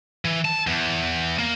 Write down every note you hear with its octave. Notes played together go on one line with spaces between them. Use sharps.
E3
A5
E2
A#3